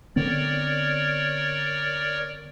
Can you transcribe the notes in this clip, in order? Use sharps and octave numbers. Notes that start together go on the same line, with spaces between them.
D3 B3 C4 A#4 C#5 D5